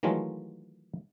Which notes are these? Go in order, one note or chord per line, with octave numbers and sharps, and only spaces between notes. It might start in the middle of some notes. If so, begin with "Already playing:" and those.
D#3 E3 F#3 G#3 A3 F4